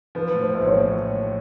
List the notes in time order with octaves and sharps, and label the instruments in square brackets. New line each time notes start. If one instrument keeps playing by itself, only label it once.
[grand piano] F3 [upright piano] B4
[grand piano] A2
[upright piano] C5
[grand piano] A#1
[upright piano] C5
C#5
[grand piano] A2